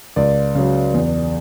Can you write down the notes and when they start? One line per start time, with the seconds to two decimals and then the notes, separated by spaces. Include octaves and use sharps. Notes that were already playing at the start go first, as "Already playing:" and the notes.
0.16 C#2 D5
0.55 C#3 F#3
0.94 E2